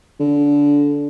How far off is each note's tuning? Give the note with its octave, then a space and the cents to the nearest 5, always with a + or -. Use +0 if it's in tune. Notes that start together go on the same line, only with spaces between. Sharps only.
D3 -20